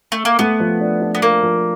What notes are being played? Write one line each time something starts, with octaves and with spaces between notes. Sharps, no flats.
A3
A#3
A3 B3
F3
D4
D4
B3
F3 A#3
F3